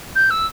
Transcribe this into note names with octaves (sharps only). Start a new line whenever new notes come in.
G6
E6